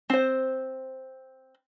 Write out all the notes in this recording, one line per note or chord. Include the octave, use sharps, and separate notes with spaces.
C4 C5